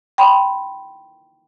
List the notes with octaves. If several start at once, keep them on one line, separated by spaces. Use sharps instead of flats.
G5 B5 C6